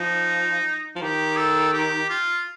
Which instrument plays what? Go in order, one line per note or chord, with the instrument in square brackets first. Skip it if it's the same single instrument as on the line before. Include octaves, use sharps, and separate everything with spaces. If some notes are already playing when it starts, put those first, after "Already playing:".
Already playing: [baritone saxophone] F3 [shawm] D#4
[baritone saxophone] F3
[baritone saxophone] D#3 [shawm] G4
[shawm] A4
G4
F4